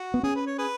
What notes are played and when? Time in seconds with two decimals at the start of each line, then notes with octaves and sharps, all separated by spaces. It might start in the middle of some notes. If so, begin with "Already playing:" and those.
Already playing: F#4
0.14 B3
0.23 C#4 G#4
0.36 B4
0.47 C#5
0.59 G#4 B4